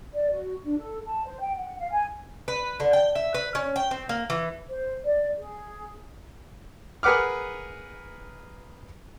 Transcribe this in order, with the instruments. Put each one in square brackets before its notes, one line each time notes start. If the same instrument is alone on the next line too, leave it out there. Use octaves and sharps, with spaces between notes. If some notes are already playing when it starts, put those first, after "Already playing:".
[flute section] D5
F#4
D4
A4
A5
C5
G5
F#5
F5
G#5
[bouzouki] B4
D3
G5
E5
B4
C#4
G5
C4
A#3
E3
[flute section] C5
D5
G#4
[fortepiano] G#4 A#4 B4 F#5 D6 F6